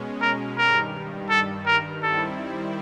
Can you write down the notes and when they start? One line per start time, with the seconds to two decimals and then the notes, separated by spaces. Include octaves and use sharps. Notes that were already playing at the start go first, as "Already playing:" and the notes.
Already playing: B2 G#3 C#4
0.21 A#4
0.58 G2 D#3 G3 A#4
1.29 A4
1.66 A#4
2.02 D#3 G3 C4 E4 A4